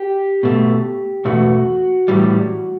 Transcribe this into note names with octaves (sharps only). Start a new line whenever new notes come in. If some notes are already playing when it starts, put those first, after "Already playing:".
Already playing: G4
B2 A3
E2 B2 A3 F#4
A2 E3 G3